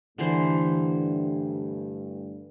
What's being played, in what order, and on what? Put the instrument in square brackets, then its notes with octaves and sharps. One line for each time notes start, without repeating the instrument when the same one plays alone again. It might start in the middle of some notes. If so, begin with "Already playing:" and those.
[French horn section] G2 A3 [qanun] D3 E3 C5